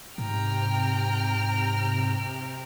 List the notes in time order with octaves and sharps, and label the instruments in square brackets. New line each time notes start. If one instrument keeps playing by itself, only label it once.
[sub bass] G#2 [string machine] C3 [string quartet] G5 A#5 F6